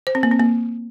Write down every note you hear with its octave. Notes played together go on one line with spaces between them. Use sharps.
C5
C4
A#3
C4
A#3